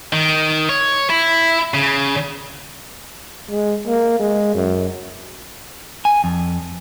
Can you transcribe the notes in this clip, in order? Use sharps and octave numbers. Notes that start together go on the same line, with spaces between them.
D#3
C#5
E4
C#3
G#3
A#3
G#3
F#2
G#5
F2